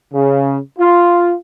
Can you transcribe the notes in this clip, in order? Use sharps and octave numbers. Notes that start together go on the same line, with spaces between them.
C#3
F4